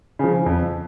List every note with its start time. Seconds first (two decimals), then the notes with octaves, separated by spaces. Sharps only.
0.19 C#3 F3
0.46 F2